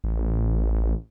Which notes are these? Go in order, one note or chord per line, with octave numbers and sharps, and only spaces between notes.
A1